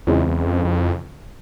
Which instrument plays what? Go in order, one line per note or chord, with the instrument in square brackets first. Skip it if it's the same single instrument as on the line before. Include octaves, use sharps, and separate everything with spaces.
[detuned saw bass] E2 [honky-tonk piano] C#3 E3 G#3 C4 F4
[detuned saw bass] E2
F2
F2